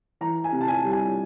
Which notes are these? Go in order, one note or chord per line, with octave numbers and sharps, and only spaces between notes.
E3 A#5
G#5
C3
A5
G#5
G3
G#5